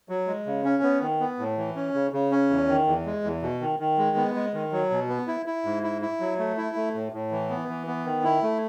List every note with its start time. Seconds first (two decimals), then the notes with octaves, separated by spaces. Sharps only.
0.09 F#3
0.27 G#3
0.46 C#3
0.64 C#4
0.83 B3
1.01 D#3
1.20 B3
1.39 A2
1.58 E3
1.75 C#4
1.94 C#3
2.13 C#3
2.31 C#4
2.50 E2
2.68 D#3
2.87 E2
3.05 G#3
3.24 E2
3.42 B2
3.61 D#3
3.79 D#3
3.98 G#3
4.17 B3
4.35 G#3
4.54 D#3
4.72 F#3
4.90 B2
5.09 B3
5.28 E4
5.46 E4
5.65 G#2
5.83 E4
6.02 E4
6.20 F#3
6.39 A3
6.57 E4
6.76 A3
6.94 A2
7.13 A2
7.31 E3
7.50 B3
7.68 E3
7.87 B3
8.05 D#3
8.24 E4
8.42 A3